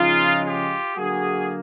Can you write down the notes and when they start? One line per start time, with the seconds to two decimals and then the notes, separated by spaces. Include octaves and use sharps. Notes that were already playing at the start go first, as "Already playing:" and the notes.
Already playing: C#3 F3 G#3 D#4 F4
0.43 F4 G4
0.95 D3 F#3 A#3 F#4 G#4